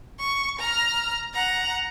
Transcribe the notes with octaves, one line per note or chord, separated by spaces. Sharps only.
C#6
A#5 F6
F#5 A#5